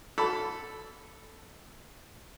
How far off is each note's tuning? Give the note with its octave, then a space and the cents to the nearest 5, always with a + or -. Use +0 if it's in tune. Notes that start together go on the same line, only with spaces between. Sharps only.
A4 +0 B5 +0 D6 -35